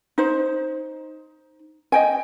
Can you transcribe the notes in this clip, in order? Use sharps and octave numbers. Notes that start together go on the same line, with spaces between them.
D#4 C5
D#5 G5 G#5